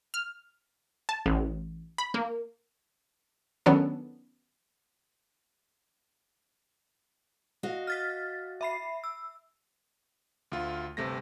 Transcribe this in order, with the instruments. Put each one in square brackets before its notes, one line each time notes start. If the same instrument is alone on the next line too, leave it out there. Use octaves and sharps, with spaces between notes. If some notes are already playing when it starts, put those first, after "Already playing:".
[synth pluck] F6
A5
A1
B5
A#3
[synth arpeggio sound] D#3 F#3 B3 C#4 D4 A4
[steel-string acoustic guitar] F#4 D#5 F5
[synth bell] F6 A6 B6
E5 B5 C7
E6
[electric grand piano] D2 F4
G1 C3 A3 A#6